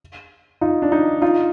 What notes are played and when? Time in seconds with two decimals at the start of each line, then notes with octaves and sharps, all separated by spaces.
0.61 D#4 F4
0.82 D4
0.92 D#4
1.22 D#4 F4